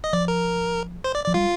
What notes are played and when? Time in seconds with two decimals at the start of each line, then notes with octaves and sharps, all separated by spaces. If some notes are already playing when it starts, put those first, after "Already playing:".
0.04 D#5
0.13 F3 D5
0.28 A#4
1.04 C5
1.15 D5
1.25 F3 D5
1.34 G3 F4